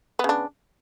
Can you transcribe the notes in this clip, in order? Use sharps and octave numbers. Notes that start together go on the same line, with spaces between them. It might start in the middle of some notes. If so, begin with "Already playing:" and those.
C#3 B3 D4